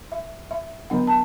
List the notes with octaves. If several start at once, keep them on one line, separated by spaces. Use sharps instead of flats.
E5
E5
D3 F#3 B3 D4 F#5
A5